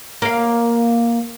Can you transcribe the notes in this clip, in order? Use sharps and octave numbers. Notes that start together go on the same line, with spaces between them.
A#3 F5